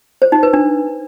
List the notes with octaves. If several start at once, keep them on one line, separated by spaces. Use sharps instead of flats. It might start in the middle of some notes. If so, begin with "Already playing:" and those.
C5
D#4
B4
D4